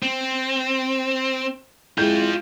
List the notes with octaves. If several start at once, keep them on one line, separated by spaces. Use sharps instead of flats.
C4
G#3 E4 F4 G5 G6